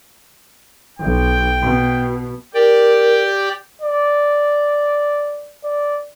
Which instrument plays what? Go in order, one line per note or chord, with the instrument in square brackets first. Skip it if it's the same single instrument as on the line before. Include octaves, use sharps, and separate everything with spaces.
[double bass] B1 [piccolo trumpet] G5
[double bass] B2
[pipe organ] G4 D5 G5 [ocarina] A#4
[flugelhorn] D5
D5